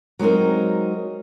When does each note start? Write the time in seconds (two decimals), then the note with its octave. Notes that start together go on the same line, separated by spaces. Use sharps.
0.19 F#3 G#3 C4 D#4 A#4